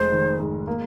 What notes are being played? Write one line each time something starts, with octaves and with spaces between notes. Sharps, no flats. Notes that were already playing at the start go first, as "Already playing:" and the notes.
Already playing: F1 G#3 C5
D#3
G#2
A#3